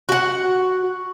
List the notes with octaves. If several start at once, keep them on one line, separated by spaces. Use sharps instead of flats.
F#4 F#5